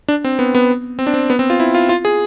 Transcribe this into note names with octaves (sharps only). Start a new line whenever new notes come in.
D4
C4
B3
B3
C4
D4
C4
B3
C4
F4
E4
F4
F4
G#4